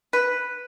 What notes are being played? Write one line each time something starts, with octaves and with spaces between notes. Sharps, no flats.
B4